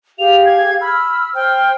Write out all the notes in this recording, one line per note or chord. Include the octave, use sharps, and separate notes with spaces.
G4 G#4 F5 F7
G#6
B5 E6 F6
C5 G5 F6